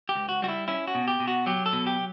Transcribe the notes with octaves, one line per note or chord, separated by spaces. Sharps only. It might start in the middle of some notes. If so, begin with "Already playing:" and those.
G4
C#2
F#4
G3 F#4
E4
C#4 E4
F#4
B2
G4
B2
F#4
F#3 G4
A4
B2
G4